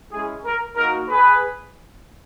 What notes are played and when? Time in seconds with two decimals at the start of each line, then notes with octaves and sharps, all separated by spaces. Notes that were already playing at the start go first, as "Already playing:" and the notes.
0.11 G#3 C#4 E4 G#4
0.44 A#4
0.76 A#3 D#4 F#4 A#4
1.08 G#4 B4